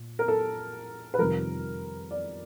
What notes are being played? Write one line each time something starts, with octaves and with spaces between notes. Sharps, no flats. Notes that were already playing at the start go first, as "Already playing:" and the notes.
Already playing: A#2
A#4
A4
B4
F2 C3 D#3 G3 A#4
D5